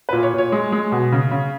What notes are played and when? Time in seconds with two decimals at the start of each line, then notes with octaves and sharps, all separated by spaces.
0.09 B4
0.13 A#2
0.23 C#5
0.34 A#2 C#5
0.52 G#3
0.72 G#3
0.92 B2
1.12 C#3
1.31 C#3